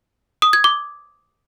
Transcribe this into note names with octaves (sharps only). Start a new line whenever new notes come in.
D#6
G#6
D6